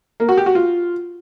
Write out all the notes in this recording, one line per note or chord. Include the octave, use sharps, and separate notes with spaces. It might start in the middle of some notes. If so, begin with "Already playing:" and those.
A#3
F#4
G4
F#4
F4